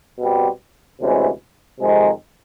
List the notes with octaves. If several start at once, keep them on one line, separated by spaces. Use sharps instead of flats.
B2 G3 C4
D2 C3 E3 G#3 C#4
F2 C3 D#3 G#3